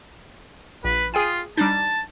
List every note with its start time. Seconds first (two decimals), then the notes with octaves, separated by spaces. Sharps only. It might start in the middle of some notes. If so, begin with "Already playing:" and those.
0.84 A#1 B4
1.14 F4 G#4 G5 G#5
1.57 G3 D4 D#4 A5